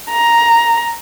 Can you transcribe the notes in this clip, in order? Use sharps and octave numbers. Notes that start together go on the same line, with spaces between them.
A#5